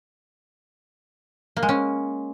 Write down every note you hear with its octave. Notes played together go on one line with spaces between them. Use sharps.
A#3
G#3
C#4